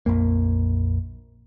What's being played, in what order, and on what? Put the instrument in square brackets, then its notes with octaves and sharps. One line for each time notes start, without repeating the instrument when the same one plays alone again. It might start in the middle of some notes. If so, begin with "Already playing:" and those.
[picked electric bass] A#1 F2 A#3